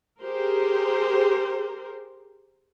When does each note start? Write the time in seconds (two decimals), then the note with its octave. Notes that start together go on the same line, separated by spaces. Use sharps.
0.22 G4 G#4 A#4 C5